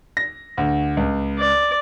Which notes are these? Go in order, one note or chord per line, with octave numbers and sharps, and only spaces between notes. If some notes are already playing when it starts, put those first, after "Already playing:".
A#6
D2
C#2
D5